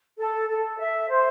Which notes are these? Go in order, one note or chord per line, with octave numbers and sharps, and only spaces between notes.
A4
A4
E5
C5